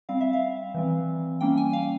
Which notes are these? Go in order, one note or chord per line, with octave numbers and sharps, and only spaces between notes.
G3 C4 F5
E5
F5
E3 G3 C4
G3 A#3 C#4 G5
G#5
F5